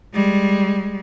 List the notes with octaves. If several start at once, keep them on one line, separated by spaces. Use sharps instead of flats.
G3 G#3